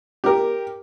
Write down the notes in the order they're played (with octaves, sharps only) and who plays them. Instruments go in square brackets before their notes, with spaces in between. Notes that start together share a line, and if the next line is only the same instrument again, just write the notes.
[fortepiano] G4 A#4